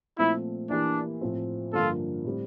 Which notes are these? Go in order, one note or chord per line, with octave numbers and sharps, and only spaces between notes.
A#2 F3 A3 C4 E4
E3 A#3 D4 E4 G4
A2 F3 C4
G2 D3 F3 A#3 F4 A4
A2 G3 C4